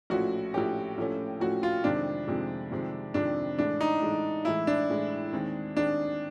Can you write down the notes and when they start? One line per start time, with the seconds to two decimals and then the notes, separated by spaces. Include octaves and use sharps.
0.10 A#1 A2 F3 A3 C#4 F#4
0.54 A#1 A2 F3 A3 C#4 G4
0.98 A#1 A2 F3 A3 C#4
1.40 A#1 A2 F3 A3 C#4 F#4
1.63 F4
1.84 F2 C3 D#3 G#3 C4 D4
2.28 F2 C3 D#3 G#3 C4
2.72 F2 C3 D#3 G#3 C4
3.14 F2 C3 D#3 G#3 C4 D4
3.58 A2 E3 G#3 D4
3.81 D#4
4.02 A2 E3 G#3
4.45 A2 E3 G#3 E4
4.67 D4
4.90 A2 E3 G#3
5.32 D#2 D#3 G#3 C4 D#4
5.76 D#2 D#3 G#3 C4 D4 D#4